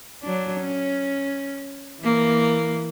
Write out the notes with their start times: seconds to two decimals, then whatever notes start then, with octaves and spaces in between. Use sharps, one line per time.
0.23 F#3 D4
0.60 C#4
2.02 E3 A#3